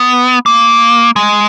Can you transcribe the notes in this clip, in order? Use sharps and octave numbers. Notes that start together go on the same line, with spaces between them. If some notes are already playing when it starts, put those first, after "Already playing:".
Already playing: B3
A#3
G#3